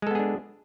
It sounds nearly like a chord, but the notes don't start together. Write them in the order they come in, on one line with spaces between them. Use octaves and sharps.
G#3 A4 B3 G#4 D4